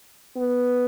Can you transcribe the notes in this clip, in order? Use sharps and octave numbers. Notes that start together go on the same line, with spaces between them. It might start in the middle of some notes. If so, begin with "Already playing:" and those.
B3